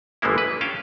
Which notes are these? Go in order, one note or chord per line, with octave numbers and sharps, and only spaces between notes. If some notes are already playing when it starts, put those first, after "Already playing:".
G1 E3 F3 G#3 A#3 E4
B4
C#4 F5 G5 A5